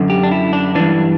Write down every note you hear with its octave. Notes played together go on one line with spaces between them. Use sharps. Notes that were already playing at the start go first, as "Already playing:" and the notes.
Already playing: F#2 D3
G4
D4
E4
D4
G2 E3 D4